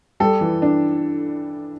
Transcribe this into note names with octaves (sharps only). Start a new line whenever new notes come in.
G3 A4
E3
D4